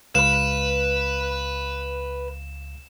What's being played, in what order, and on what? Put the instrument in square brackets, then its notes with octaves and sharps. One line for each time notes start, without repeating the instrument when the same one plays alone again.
[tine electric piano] C#2 F5 [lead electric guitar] B4 B5 [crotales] E7